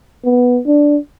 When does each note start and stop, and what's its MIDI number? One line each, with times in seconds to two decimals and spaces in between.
0.25 0.60 59
0.66 0.97 62